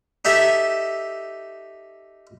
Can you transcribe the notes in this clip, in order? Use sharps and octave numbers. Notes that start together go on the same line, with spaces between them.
D#4 G4 A4 E5